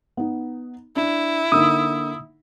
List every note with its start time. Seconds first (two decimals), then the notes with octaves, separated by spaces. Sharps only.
0.17 B3 D#4
0.96 D4 E4
1.52 D3 A#3 D#4 D#6 E6